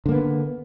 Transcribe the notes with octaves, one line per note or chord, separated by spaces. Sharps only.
D3 A#3 B3